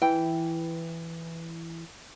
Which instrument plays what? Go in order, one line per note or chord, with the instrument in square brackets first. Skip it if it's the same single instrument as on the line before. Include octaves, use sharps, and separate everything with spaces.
[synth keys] E3 [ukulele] G5